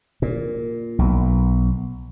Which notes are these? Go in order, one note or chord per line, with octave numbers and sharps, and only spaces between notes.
A#2
B1